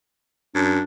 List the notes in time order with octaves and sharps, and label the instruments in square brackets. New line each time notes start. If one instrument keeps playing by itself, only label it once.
[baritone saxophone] F#2 [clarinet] D4